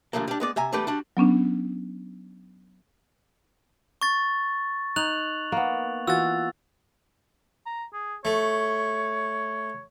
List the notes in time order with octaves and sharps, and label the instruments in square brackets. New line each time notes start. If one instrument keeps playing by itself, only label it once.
[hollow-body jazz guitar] G2 D3 F3 A3 A#3
G3 D4
G#3 B3 D5
C3 E5 G#5 A#5
E2 G3 A3 G4 B4 B5
G3 D4 F#4
[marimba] F#3 B3 C#4 D4
[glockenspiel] C#6 A6
[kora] D#4 [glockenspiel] F#6 F7 F#7
[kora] A#3 B3
[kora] E3 F4 F#4 [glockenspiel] E6 A6
[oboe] A#5
G#4
[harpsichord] A3 [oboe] C#5